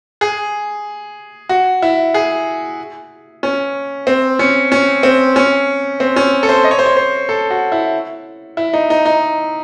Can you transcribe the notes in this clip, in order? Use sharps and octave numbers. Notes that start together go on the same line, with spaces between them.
G#4
F#4
E4
G#4
C#4
C4
C#4
C#4
C4
C#4
C4
C#4
A4
C5
D#5
C#5
C5
C#5
C5
A4
F#4
E4
E4
D#4
D#4
D#4